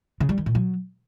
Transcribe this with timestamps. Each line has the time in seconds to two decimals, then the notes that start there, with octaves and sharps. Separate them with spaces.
0.20 C#3
0.29 G3
0.38 D#3
0.46 A#2
0.55 F#3